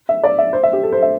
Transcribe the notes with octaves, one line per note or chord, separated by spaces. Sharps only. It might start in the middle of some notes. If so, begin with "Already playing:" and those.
E5
D5
E5
C5
E5
G4
A4
C5
E5